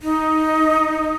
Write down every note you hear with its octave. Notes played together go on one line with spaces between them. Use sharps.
D#4